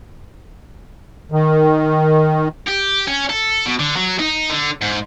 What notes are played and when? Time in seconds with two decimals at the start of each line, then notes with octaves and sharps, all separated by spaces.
1.32 D#3
2.67 G4
3.08 C#4
3.30 A4
3.66 B2
3.79 D3
3.96 F#3
4.19 D#4
4.50 D3
4.82 G#2